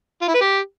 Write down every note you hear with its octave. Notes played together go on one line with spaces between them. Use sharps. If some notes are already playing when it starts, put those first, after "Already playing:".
F4
E4
B4
G4